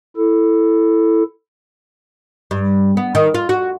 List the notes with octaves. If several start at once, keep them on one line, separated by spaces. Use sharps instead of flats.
E4 A4
G2
B3
D#3
F4
F#4